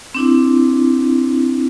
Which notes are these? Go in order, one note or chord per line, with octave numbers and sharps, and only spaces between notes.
C4 D4 E4